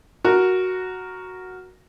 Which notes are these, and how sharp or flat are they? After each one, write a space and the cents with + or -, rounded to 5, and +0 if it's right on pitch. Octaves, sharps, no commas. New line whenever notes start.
F#4 +0 A#4 +0